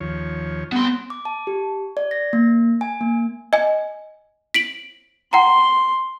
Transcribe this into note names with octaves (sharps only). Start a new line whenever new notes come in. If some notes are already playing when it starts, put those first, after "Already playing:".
D#2 F3 C#5
G3 B3 F#5 C6
D6
A5
G4
D5
A#6
A#3
G#5
A#3
D#5 G#5
B6 D7 F#7
F#5 G5 A#5 C6